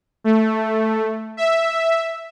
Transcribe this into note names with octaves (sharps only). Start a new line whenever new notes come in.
A3
E5